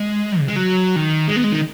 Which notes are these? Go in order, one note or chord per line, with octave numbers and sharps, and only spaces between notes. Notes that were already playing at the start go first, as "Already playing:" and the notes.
Already playing: G#3
C#3
G#3
F#3
D#3
G#3
B3
G#3
D#3